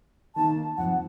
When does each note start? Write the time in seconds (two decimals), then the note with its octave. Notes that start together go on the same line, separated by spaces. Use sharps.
0.35 D#3 A#3 D#4 A5
0.77 F2 F#5